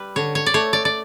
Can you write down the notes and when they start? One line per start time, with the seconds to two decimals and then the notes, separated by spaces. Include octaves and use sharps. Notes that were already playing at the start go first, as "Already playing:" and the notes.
Already playing: G3 B4
0.16 D3 C#5
0.35 C#5
0.46 D5
0.54 A3 C#5
0.73 D5
0.85 D5